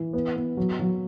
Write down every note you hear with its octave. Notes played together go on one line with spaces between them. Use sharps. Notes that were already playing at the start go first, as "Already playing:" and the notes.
Already playing: E3
B3
B3
F#3
F#3